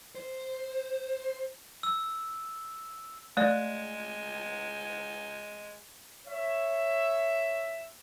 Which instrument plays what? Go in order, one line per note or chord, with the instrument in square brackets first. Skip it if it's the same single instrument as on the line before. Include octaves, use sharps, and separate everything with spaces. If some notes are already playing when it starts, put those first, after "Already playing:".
[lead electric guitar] C5
[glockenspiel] E6
[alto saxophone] G#3 [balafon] A3 D5
[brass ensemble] C#5 E5